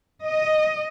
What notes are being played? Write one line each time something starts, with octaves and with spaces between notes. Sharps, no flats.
D#5